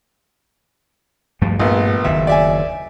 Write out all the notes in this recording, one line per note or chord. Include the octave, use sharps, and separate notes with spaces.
G2 F3 A3
A#1 G2 A3 B3
F#1 D#2 D#3 E5
D5 E5 G#5